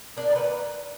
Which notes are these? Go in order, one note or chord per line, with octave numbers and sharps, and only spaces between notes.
A#3 D4
D5
D#3 B4